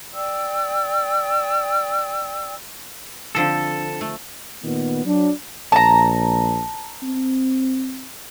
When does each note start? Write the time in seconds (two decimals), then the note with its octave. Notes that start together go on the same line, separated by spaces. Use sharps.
0.15 D5 G5 E6
3.35 D3 F3 C4 A4
4.01 A3
4.64 A#2 D#3 B3
5.05 F#3 D4
5.72 A#1 A5 A#5
7.02 C4